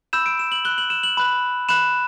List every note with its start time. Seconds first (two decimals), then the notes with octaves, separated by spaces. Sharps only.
0.13 B5 E6 G6 E7
0.26 D7
0.39 E7
0.52 F#7
0.65 B5 F#6 G7
0.78 F#7
0.90 E7
1.03 F#7
1.17 B5 F#6
1.69 B5 F#6 E7